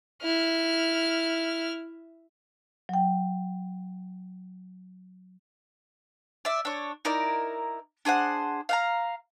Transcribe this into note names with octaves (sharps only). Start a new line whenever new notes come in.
E4 F6
F#3 G5
D5 E5
D4 C#5
D#4 E4 A#4 D5
D4 G#4 C5 F#5
F5 F#5 A#5